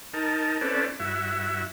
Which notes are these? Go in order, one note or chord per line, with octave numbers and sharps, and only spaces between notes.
D#4 A#4 A5
C4 C#4 E4 A4 B4 D5
G2 E4 F#4 E5